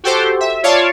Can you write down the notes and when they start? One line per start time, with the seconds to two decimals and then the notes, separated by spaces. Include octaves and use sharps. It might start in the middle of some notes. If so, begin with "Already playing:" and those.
0.04 F#4 G4 A4 C5
0.40 E5
0.63 F4 C#5 D5 F5 A5